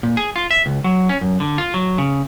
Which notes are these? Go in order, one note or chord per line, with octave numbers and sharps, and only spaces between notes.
A#2
G#4
F4
E5
C#2
F#3
C#4
F#2
D3
F4
F#3
C#3